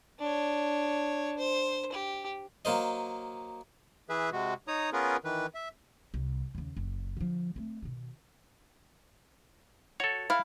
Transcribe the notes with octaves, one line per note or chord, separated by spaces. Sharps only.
D4 C#5
C5
G4
F#3 A#3 A#4 C5 D#5
E3 G#4 B4 E5
C3 G#3 F#4
D#4 C#5 A#5 D#6
B3 C#4 F4 G#4 A#4 B4
D#3 E3 B4
E5
C2
D#2 C#3
F#1
D3 F3
A3 C4
B2 D#3
F#4 A4 C#5
E4 F5